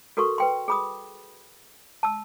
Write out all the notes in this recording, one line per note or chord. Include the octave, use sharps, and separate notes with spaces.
F#4 A4 A#4 C6 C#6
B4 G5 C6
G#4 B5 D#6
A5 E6